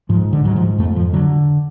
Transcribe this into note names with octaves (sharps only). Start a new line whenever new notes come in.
G#2 F3
D3
G#2 F#3
F3
F2 A3
F3
D3 F#3